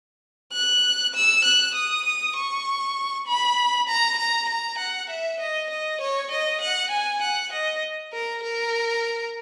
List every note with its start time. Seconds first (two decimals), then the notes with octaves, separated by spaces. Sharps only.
0.53 F#6
1.14 E6
1.45 F#6
1.74 D#6
2.05 D#6
2.36 C#6
3.27 B5
3.88 A#5
4.18 A#5
4.49 A#5
4.78 F#5
5.10 E5
5.40 D#5
5.70 D#5
6.01 C#5
6.31 D#5
6.61 F#5
6.91 G#5
7.22 F#5
7.52 D#5
8.13 A#4
8.43 A#4